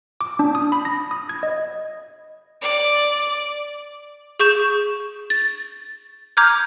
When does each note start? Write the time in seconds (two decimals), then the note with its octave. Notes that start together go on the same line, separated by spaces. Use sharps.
0.21 D6
0.39 D4
0.55 D#6
0.72 B5
0.85 A#6
1.11 D#6
1.29 G#6
1.43 D#5
2.62 D5
4.40 G#4 C#6 G6 E7
5.30 A6
6.37 A#5 D6 F6 G6 G#6